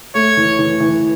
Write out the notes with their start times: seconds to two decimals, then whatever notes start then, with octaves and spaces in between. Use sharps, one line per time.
0.15 A3 C#5
0.37 E3
0.59 E3
0.80 E3